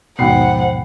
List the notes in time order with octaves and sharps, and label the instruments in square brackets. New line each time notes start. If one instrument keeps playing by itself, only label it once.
[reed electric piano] D#2 G#2 B2 [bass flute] F3 [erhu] F#5 [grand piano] G5 B5 C7